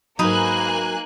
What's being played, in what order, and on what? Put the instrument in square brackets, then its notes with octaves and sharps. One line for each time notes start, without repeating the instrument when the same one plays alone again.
[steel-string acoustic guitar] G#2 F#3 [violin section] A#3 G#5 F#6 [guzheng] D#4 B4